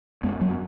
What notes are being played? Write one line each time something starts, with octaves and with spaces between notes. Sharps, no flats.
F#2 G#3 B3
F#3 A#3